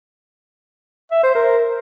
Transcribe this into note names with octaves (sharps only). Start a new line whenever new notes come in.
E5
C5
A#4